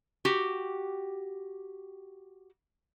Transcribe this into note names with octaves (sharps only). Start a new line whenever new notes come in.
F#4 G4